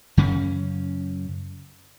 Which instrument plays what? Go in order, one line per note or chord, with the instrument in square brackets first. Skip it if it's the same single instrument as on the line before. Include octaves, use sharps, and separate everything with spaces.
[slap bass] F#2 C#3 C#4